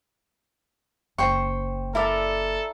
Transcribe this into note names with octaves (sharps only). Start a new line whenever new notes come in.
F#1 C5 G5 C#6
E4 A4 A#4 D5